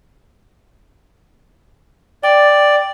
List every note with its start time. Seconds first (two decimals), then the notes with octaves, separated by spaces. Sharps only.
2.23 D5 G5